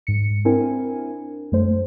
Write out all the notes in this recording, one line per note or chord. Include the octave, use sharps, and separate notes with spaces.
G#2 C#7
C4 D4 E4 A#4 G#5
F#2 A3 C5